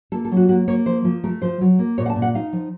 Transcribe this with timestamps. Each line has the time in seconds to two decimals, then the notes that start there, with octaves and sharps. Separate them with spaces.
0.12 A#3 A4
0.25 A4
0.31 F#3
0.37 F#4
0.49 A#3 F#4
0.68 A#3 C#5
0.86 F3 C5
1.04 F3
1.24 A3 A#4
1.42 F3 C5
1.61 F#3
1.79 A#3
1.98 A#2 C#5
2.06 F#5
2.10 A5
2.16 A#2
2.22 F#5
2.35 D#4 F5
2.53 F3